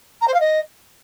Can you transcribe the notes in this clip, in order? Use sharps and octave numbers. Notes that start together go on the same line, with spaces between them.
A#5
C5
F5
D#5